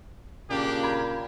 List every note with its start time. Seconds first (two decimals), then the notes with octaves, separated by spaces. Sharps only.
0.50 A#2 C#3 A#3 D4 G4
0.83 A#5 B5 G#6